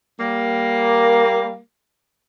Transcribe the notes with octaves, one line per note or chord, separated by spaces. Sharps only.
G3 A#3